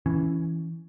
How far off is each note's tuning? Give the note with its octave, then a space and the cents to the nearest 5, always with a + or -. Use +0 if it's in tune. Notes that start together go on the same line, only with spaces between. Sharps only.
E3 +0 C#4 +0